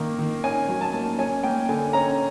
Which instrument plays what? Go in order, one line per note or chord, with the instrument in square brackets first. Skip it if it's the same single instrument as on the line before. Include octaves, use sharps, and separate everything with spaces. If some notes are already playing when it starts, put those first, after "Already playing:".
Already playing: [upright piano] D#3 A#3
D#3
C#4 G#5
F#3
A5
A#3
C#4 G#5
A#3 G5
D3 G#5
C#4 A#5